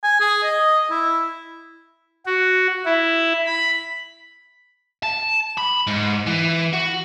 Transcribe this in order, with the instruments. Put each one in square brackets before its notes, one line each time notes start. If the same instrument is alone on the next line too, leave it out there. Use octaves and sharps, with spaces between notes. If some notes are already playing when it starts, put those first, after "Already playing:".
[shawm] G#5
G#4
D#5
E4
[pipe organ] F#4
E4
B5
[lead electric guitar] A5
B5
G#2
E3
F#4